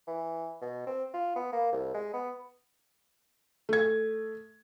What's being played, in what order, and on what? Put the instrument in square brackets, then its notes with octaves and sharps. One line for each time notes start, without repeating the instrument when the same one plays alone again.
[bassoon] E3
B2
C4
F4
B3
A#3
C2
G#3
B3
[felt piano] A3 G#6